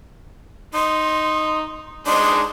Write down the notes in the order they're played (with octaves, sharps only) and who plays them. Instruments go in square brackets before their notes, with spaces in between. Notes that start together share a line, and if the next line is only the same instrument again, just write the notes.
[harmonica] D#4 [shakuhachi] C6
[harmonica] G#3 D4 D#4 [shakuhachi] C6